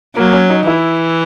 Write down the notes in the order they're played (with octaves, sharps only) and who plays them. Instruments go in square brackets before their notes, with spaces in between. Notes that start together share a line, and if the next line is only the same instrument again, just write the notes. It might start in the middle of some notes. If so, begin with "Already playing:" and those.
[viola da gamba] F#3 [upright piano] A#3
[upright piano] C#4
D#4
[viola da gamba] E3 [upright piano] E4